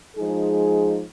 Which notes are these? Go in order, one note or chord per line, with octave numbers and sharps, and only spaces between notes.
F3 G#3 D#4 G#4